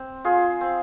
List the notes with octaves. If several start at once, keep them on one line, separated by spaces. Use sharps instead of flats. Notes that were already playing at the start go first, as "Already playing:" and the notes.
Already playing: C4
F4 G#4
C4